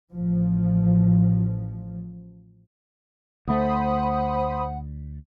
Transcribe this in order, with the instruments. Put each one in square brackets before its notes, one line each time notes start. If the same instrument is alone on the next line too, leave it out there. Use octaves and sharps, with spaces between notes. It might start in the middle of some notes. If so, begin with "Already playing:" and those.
[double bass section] A1 F3
[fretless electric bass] D2 A3 [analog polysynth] C5 B5 D#6 [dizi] F#5